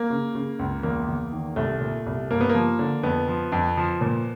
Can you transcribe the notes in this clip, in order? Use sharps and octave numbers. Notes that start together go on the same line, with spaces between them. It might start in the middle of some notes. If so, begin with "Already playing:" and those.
Already playing: A#3
C#3
C#3
C#2
E2 A#3
E2
D#3
C2 A3
A#2
C2
G2 A#3
B3
F3 A#3
D3
F2 B3
F3
F2
F3
A#2